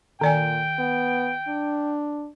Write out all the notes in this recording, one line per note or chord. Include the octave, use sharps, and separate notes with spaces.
A#2 D#3 D5 G5 G#5
B3
D4